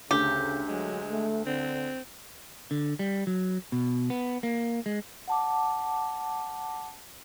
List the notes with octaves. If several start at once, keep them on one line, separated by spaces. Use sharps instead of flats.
D2 C#3 G4
F#3 G#3
A3
D3 C4
D3
G3
F#3
B2
B3
A#3
G#3
F#5 A5 D6